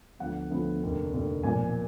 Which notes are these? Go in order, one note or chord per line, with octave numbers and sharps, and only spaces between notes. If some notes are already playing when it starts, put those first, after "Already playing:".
D2 D3 F3 B3 F#5
D2 D3 F3 B3
F1 D#2 D3
F1 D#2 D3
B1 A#2 F3 G#5